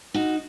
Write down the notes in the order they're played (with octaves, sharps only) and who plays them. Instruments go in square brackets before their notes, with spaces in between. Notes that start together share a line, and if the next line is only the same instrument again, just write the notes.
[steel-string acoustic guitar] D#4 F#4